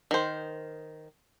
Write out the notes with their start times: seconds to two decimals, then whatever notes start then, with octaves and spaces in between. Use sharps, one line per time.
0.11 D#3 C5